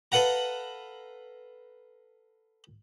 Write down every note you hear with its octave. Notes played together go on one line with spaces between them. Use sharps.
A4 B4 F5 F#5 A#5